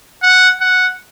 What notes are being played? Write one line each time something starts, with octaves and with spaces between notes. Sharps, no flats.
F#5
F#5